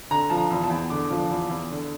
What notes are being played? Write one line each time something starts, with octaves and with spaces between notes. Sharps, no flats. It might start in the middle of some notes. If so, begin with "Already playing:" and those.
D3 A#5
F3 A5
A#5
E2
A5
E2
D3 D6
F3
E2
E2
D3